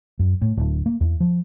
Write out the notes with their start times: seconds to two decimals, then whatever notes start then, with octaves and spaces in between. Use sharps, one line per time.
0.19 F#2
0.42 A2
0.57 D1
0.86 A#3
1.01 E2
1.20 F3